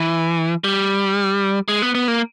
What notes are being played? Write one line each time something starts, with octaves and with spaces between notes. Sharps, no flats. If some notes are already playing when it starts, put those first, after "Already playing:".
Already playing: E3
G3
G#3
B3
B3
A#3